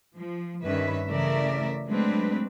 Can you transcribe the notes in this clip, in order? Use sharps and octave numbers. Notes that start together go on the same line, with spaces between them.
F3
G2 D#3 C#4 B4 E5
C#3 E3 A3 A#4 D5 E5
F#3 G#3 A3 C4 D4 B4